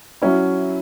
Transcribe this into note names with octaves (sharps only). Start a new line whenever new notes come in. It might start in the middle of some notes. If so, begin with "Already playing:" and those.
F#3 C#4 E4